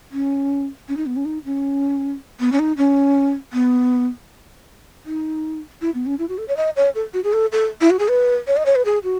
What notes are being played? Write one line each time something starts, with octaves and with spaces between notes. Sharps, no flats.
C#4
C#4
D#4
B3
C#4
D#4
C#4
B3
C#4
D#4
C#4
B3
D#4
E4
B3
C#4
E4
F#4
A4
C#5
D#5
C#5
A4
F#4
G#4
A4
A4
E4
F#4
G#4
B4
C#5
D#5
C#5
B4
G#4
F#4